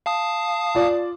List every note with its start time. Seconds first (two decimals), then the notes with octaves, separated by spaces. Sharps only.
0.06 F5 A5 D#6
0.75 F4 D5